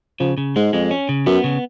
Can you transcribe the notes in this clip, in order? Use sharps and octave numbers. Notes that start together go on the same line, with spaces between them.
C#3 F3
C#3
G#2 G#3
F2 G#3
C#4
C#3
F#2 B3
C#3